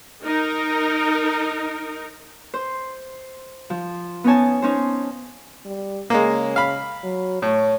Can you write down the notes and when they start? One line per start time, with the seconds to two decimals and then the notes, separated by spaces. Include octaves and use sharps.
0.24 D#4 A#4
2.54 C5
3.70 F3
4.24 B3 C#4 D#4 C#5 G#5 A5
4.62 C#4 D#4 C5
5.65 G3
6.10 C#3 G#3 A#3
6.56 F5 B5
7.03 F#3
7.42 A2 C#5